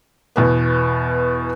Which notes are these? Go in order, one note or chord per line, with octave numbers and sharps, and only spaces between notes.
E2 B2 B3